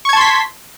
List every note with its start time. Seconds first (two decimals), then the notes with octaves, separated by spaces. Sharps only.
0.05 C#6
0.09 G#6
0.13 A5
0.17 C6
0.21 B6